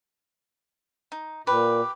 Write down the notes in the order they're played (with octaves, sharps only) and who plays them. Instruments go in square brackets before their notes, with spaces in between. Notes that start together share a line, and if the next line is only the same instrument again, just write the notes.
[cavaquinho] D#4
[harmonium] A#2 [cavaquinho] G4 B4 [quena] D6